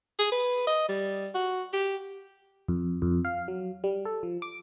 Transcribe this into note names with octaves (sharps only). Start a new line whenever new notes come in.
G#4
B4
D#5
G3
F#4
G4
F2
F2
F5
F#3
G3
A4
F3
D6